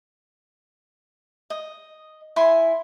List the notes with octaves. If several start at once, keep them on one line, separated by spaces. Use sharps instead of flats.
D#5
E4 G#5 C6